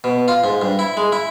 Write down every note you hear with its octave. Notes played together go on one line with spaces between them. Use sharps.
B2
F4
G#2
G2
E4
G#3
E4